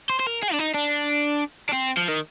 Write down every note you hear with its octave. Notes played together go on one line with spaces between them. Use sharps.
C5
C5
A#4
G#4
D4
D#4
D4
D4
C4
F3
D#3